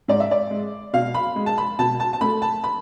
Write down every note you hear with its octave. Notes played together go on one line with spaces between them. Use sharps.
G#2 D5
E5
D5
G#3
B2 F5
B5
G#3
A5
B5
B2 A5
A5
A5
A3 B5
A5
B5